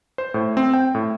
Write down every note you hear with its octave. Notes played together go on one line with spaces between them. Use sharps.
C5
A2
C4
G5
A2